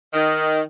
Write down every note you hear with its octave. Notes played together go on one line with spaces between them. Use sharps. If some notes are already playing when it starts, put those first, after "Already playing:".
D#3